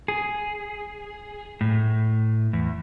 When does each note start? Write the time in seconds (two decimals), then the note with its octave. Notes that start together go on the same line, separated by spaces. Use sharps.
0.08 G#4
1.61 A2
2.53 E2